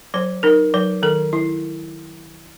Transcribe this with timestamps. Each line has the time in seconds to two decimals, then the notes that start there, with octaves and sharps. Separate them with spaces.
0.14 F#3 C5
0.43 D#4 A#4
0.74 F#3 B4
1.03 D#3 A4
1.33 E4